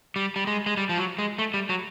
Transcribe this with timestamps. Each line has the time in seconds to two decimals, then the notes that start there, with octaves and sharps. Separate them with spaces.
0.16 G3
0.36 G3
0.47 G#3
0.66 G#3
0.77 G3
0.89 F3
0.98 F#3
1.19 G#3
1.38 A3
1.54 G3
1.69 F#3